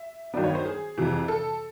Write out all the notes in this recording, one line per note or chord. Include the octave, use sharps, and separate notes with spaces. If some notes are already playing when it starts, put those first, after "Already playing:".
Already playing: E5
G2 D#3 F#3 B3 D5
C#5
C5
G#4
F2 C3 E3
A4